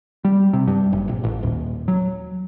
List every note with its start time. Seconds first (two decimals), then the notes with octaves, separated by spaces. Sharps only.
0.25 G3
0.53 C3
0.68 G2
0.93 F#1
1.09 A#1
1.24 A1
1.43 D#1
1.88 F#3